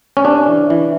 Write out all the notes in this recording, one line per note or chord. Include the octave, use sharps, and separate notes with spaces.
C#4
C3 D4
E3
E3